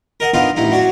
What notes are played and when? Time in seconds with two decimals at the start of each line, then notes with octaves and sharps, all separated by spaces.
0.20 A#4 D#5 F#5
0.34 B3 D4 D#4 F4 F5
0.56 A1 D#4 E4
0.71 F#3 D4 F#4